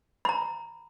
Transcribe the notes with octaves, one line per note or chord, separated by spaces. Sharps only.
A#5 B5